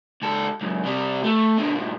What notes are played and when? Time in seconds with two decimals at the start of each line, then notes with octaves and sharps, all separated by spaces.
0.22 C#2 A4
0.61 C#2 F#2
0.84 C3 G3
1.23 A3
1.58 B2 D3
1.75 G2 A#2